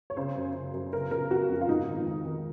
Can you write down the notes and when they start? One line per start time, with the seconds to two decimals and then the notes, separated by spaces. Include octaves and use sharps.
0.10 C#5
0.17 C#3 C5
0.36 F#2
0.55 C#3
0.74 F#2
0.93 C#3 A#4
1.11 C#3 A#4
1.30 C#3 F#4
1.49 F2
1.61 F4
1.69 G#2 D#4
1.88 D#3
2.06 D#3
2.26 D#3